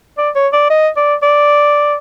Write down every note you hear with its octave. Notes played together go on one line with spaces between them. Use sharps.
D5
C#5
D5
D#5
D5
D5